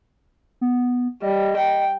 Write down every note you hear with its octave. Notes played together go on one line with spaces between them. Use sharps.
B3
G3 D#5
G5